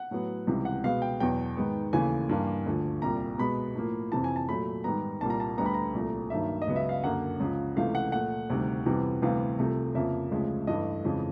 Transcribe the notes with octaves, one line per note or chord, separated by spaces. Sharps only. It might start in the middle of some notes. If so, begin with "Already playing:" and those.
Already playing: F#5
A2 F#3 B3
C#2 C3 E3 G3
F#5
B2 G#3 B3 F5
G5
E2 B2 F#3 G5
G#2 D#3 G#3 B3
D#2 C#3 E3 A3 G#5
G2 E3 G3 A#3
D2 D3 F3
C2 A#2 G3 A#5
B2 G#3 B3 B5
A2 F3 A#3
F2 C3 E3 A5
G#5
A5
A#2 F#3 A3 B5
G#2 D#3 G3 B3 A#5
C2 A#2 G3 A#3 A5
A#5
A5
D2 D3 G3 B3 A#5
B5
A#5
C2 A#2 F3 A3
G2 D#3 F#3 A#3 E5
D#5
C#2 C#3 F#3 B3
E5
F5
F#2 D3 F#3 A#3 F#5
C#2 C#3 F3
C#2 C3 E3 A3 F5
F#5
A#2 F3 A3 F#5
D2 C3 D#3 G3
F2 C3 E3 G3 B3
D2 C3 E3 G3 B3 F5
C2 C3 F3 A3
F2 C#3 F3 A#3 E5
D2 C#3 F3 G#3
G2 E3 A3 D#5
F2 C#3 E3 G#3